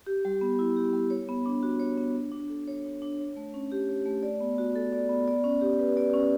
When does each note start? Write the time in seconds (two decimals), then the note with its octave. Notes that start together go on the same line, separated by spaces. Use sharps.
0.06 G4
0.25 G3
0.41 B3
0.59 E4
0.77 G4
0.93 G3
1.10 C#5
1.29 B3
1.46 D4
1.63 F#4
1.80 C#5
1.97 B3
2.16 D4
2.32 D4
2.50 A4
2.68 C#5
2.84 D4
3.02 D4
3.19 C#5
3.36 A3
3.54 C#4
3.72 G4
3.89 C#5
4.06 A3
4.23 D5
4.40 B3
4.58 F#4
4.76 A4
4.92 D5
5.09 B3
5.28 D5
5.44 C#4
5.61 G4
5.79 B4
5.97 D5
6.14 C#4